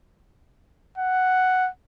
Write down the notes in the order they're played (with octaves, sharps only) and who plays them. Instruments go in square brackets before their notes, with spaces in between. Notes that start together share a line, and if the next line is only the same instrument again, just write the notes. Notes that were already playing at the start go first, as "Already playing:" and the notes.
[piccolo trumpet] F#5